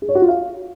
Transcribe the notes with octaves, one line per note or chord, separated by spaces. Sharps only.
G#4
C#5
F#4
F4
F5